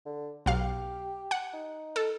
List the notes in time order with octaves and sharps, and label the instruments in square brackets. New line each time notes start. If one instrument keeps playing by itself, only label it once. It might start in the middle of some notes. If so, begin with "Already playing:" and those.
[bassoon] D3
[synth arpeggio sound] B1 F5 [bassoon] G4
[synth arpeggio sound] F#5
[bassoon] D#4
[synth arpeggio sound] A4